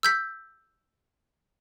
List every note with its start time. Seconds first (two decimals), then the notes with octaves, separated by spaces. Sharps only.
0.03 E6 G6 B6